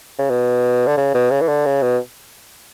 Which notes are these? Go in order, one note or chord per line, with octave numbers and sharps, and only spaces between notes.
C#3
B2
D3
C#3
B2
C#3
E3
D3
C#3
B2